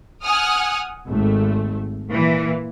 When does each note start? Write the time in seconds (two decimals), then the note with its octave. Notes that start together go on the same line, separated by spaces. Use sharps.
0.23 F#5 G#5 D#6 F6
1.08 G#1 A3
2.10 A#2 E3